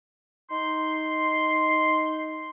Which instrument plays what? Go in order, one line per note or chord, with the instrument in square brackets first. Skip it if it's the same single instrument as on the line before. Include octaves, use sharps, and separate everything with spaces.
[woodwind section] D#4 C6